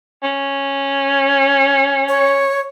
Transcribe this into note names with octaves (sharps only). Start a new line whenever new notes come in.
C#4
C#5